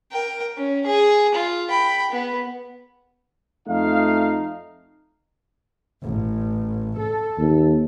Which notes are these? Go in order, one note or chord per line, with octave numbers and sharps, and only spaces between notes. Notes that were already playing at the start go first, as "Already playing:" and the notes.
A#4 G5
C#4
G#4
F4
G5 B5
B3
F2 A3 D#4 F5
A1
A4
D#2